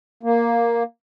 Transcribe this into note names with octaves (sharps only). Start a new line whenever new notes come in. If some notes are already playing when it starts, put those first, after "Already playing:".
A#3